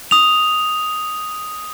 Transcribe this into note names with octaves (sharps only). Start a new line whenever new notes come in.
D#6 F7